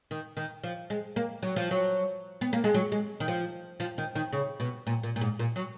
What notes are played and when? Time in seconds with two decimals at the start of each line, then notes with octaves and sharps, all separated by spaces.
0.11 D#3
0.37 D#3
0.64 F3
0.90 G#3
1.16 A#3
1.43 F#3
1.56 F3
1.71 F#3
2.41 B3
2.53 A#3
2.64 G#3
2.74 F#3
2.92 G#3
3.20 D#3
3.28 F3
3.80 F3
3.98 D#3
4.15 D#3
4.33 C#3
4.60 B2
4.87 A#2
5.03 A#2
5.16 A#2
5.21 G#2
5.39 A#2
5.56 F#3